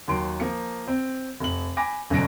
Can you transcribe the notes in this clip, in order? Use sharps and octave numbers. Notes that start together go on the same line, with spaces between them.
D#2 D#3 F#3 C6 D7
F3 A#3 C#7
C4
F1 F#7
G#5 B5 D6 A#6 D7
G1 F#2 B2 D4 A#6 D7